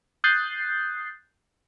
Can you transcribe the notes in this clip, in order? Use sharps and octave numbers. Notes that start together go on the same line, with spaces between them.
D#6 F#6 G6 A6 C7